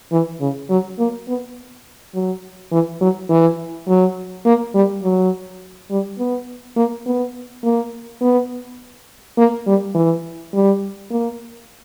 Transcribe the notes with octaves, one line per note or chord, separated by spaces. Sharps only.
E3
C#3
F#3
A#3
B3
F#3
E3
F#3
E3
F#3
A#3
G3
F#3
G3
B3
A#3
B3
A#3
B3
A#3
G3
E3
G3
A#3